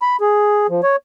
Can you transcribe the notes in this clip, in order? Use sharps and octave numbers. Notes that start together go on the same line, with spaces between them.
B5
G#4
F3
C#5